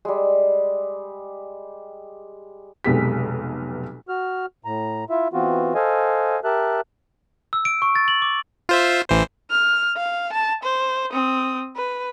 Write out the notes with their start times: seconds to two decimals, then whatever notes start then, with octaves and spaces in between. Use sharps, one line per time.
0.05 G3 G#3
2.84 F1 B1 G#3 B3 G4 B6
4.09 F#4 F6
4.65 A2 A#5
5.10 E4 F4 E5
5.33 E3 B3 C4 F4 F#4
5.75 A4 C5 D#5 F5 G#5
6.44 G4 A#4 E5 A5 F#6
7.53 E6
7.65 D7
7.82 C#6
7.95 A6
8.08 F#7
8.22 D6
8.69 F4 C5 E5
9.10 A1 E3 C5
9.50 F6
9.96 F5
10.33 A5
10.64 C5
11.12 C4 D#6
11.76 B4